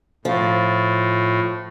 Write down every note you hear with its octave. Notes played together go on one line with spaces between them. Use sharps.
A2 F3